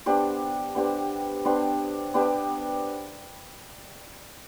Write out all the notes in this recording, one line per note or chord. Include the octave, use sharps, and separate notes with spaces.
B3 D4 G4 C5
B3 D4 G4 C5
B3 D4 G4 C5
B3 D4 G4 C5